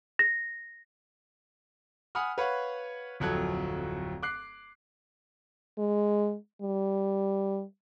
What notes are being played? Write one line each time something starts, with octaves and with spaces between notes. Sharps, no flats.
A#6
F#5 G#5 B5 D#6 F6
B4 C#5 F5 F#5 B5
D1 F2 F#3 A4 F#6 G#6
D6 F#6 C7
G#3
G3